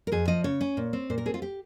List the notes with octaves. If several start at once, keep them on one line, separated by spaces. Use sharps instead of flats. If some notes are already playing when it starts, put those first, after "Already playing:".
A#4
F2 G#4
F3 D#5
C#3 C#5
C#4
A#2
C4
A#2 C5
A#4
C4 G#4
F4
G4